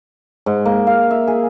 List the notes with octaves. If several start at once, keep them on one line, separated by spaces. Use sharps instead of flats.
G#2
A#3
F5
E5
G#4